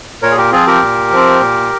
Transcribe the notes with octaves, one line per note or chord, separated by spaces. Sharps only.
A#2 A#4 C#5
G#4
G4 A#4
F3 C4 F4 G#4
G4 A#4
A#2
F3 C4
A#2